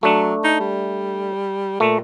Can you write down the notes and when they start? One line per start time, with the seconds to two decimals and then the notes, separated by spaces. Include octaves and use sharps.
0.03 F#3 A3 D4
0.44 D#4
0.60 G3
1.80 A#2 A3